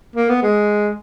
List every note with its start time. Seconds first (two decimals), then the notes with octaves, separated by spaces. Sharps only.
0.16 A#3
0.29 B3
0.43 G#3